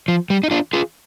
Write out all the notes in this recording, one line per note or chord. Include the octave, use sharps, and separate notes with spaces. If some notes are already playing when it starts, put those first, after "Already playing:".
F3
G3
D#4
D4 F4
F4 G#4